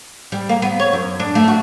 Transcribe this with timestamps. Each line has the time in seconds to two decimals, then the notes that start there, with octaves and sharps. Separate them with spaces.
0.32 G3
0.49 A#3
0.62 B3
0.79 C#5
0.93 F#2
1.20 D4
1.35 A3
1.48 F#4